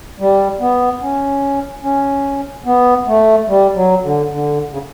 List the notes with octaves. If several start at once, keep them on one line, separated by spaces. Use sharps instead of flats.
G3
B3
C#4
C#4
B3
A3
G3
F#3
D3
D3
C#3